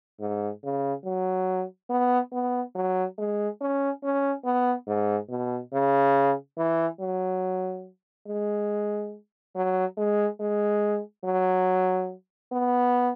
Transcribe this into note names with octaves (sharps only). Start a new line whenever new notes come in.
G#2
C#3
F#3
B3
B3
F#3
G#3
C#4
C#4
B3
G#2
B2
C#3
E3
F#3
G#3
F#3
G#3
G#3
F#3
B3